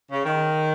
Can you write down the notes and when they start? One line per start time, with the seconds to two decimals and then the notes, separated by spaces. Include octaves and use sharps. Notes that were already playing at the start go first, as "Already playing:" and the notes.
0.12 C#3
0.25 D#3